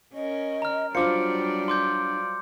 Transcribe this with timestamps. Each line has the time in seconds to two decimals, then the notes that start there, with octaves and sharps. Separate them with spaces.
0.14 C#4 A#4 D#5
0.62 A#5 F6
0.95 F#3 G3 D4 F4 C5 D5 D6 C#7
1.68 C6 D6 G6